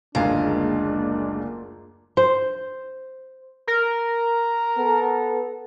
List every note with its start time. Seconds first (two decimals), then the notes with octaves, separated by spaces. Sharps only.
0.15 F#1 D2 A#2 G#3 D4 F5
2.17 C5
3.67 A#4
4.78 B3 A4